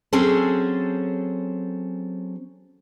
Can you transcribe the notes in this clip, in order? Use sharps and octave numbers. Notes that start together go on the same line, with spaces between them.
F#3 C4 C#4 G#4 A4 C5